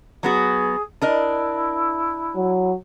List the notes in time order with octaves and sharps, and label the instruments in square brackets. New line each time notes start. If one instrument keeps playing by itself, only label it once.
[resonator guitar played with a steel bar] F#3 B3 F#4 [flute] G#4
[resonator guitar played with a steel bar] D4 A#4 D#5 [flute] E4
[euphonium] F#3